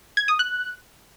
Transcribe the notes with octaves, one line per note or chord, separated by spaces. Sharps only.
G#6
D#6
F#6